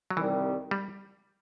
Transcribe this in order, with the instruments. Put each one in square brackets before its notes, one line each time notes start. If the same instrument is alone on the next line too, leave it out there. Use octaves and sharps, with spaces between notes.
[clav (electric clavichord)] F#3
[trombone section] C2 C3 D#3 G3 [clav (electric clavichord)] E3
[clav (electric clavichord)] G3